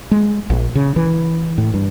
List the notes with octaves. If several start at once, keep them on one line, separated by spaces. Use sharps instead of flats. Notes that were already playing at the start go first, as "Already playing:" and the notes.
G#3
A#1
C#3
E3
A2
G2